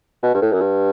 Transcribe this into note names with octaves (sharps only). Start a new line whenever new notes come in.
B2
G2
A2
F#2
G2